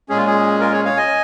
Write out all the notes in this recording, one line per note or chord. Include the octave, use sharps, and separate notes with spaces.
A#2 G#3 C#4 G#4
F4
G#4
F4 A#4
G#4 C#5
C#5 F5
D#5 G#5